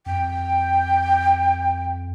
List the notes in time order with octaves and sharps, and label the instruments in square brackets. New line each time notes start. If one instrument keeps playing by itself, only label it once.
[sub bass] F2 [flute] G5